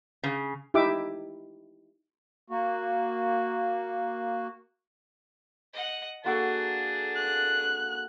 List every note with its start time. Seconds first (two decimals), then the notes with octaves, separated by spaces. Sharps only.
0.23 C#3
0.74 D#4 E4 G4 E5 D6
2.50 A#3 F#4
5.73 D#5 F#5
6.25 A#3 D4 F#4 G#4 A4 A5
7.16 F#6